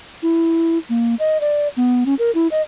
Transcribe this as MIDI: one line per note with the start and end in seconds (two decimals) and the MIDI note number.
0.23 0.78 64
0.90 1.15 58
1.19 1.38 75
1.41 1.68 74
1.77 2.04 59
2.06 2.14 61
2.19 2.31 70
2.35 2.47 64
2.52 2.62 75